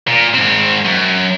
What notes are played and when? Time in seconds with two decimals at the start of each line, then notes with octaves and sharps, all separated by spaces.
0.07 A#2
0.34 G#2 C4
0.85 F#2